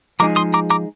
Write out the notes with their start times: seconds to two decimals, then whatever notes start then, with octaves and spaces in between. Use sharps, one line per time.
0.20 F3 G#3 D#4 G#4 A#5 D6
0.36 C6 D#6
0.54 A#5 D6
0.70 A#5 D6